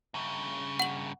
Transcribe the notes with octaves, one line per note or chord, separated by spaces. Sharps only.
G2 C#3
F#5 F#7